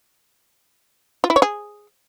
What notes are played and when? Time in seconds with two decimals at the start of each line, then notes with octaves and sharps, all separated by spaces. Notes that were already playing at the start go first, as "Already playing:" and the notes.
1.24 F4
1.30 E4
1.36 C#5
1.42 G#4